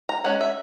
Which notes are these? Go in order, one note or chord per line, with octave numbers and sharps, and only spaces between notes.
A#5
G#3 C#4 F#5
E5